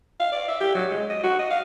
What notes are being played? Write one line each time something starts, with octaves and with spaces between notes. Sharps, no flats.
F5
D5
E5
G4
F#3
G#3
D#5
F#4
D#5
F5